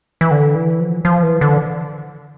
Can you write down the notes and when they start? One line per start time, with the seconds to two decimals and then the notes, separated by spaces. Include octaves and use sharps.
0.21 E3
0.31 D3
0.55 E3
0.80 F3
1.05 F3
1.23 E3
1.41 D3